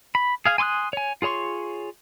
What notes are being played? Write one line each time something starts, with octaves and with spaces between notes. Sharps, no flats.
B5
G#4 F5 G#5
G#5 C6 D6 D#6 F#6
C#5 G#5
F4 G#4 C#5 C6 C#6